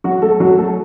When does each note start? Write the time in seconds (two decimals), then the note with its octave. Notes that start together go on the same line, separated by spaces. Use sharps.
0.04 F#3 F#4
0.22 A3 A4
0.40 F#3 F#4
0.58 A3 A4